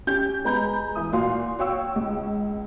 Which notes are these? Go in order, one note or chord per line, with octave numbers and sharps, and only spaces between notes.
C#4 G4 G6
G#3 B3 A#5 B5 G6
E3 E4 D#6
A#2 F#4 F5 C6
F#4 C#5 F5 G5 C#6 E6
C#2